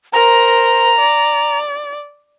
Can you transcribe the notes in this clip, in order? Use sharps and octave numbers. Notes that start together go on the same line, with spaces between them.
A#4 C5 A#5
D5